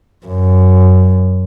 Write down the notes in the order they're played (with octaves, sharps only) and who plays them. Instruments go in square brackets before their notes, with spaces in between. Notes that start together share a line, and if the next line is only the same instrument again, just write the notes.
[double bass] F#2